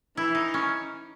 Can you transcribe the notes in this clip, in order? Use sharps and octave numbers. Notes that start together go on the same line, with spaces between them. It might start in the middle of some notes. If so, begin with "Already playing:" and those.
E3 E4
D#4
C#4